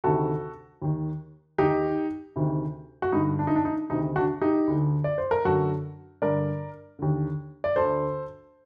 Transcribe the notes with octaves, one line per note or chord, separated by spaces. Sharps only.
D2 C3 D#3 F#4 A4
D#2 D#3
D#2 D#3 D#4 G4
D2 C3 D#3
F#4
G2 D3 D#4
D4
D#4
D4
D#4
D2 C3 D#3 D#4
D4 F#4
D#4 G4
D2 D3
D5
C5
A#4
F#2 D3 F#4 A4
G2 D3 A#4 D5
D#2 D3
D5
D2 D3 A4 C5